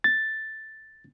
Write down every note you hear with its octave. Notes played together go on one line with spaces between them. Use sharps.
A6